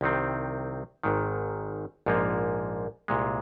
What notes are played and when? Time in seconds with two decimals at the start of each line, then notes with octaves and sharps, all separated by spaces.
0.01 C2 C3 D#3 C4
1.03 G#1 G#2 D#3
2.06 A#1 G#2 F3 A#3
3.08 C2 A#2 G#3